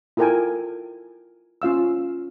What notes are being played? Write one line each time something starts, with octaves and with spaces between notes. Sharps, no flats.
E4 F4 A4 A#4 G5 G#5
C#4 F4 F5 E6